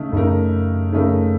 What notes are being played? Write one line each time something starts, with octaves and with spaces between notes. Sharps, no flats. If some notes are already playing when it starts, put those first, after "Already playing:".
Already playing: C#3 A3 D#4
F#2 C#3 A3 D#4 A#4
C#3 A3 D#4 A#4